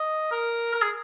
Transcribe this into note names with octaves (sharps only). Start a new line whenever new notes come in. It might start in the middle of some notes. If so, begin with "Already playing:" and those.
Already playing: D#5
A#4
A#4
G#4